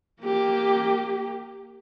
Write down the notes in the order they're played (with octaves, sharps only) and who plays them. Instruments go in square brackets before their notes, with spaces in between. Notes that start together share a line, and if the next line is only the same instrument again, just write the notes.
[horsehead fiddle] A#3 G4